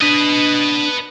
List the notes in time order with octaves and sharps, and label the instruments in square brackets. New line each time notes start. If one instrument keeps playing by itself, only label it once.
[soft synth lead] D4 [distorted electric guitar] B4 D#5